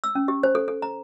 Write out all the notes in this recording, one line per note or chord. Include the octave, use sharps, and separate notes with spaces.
E6
C#4
G4
C5
A4
A4
A#5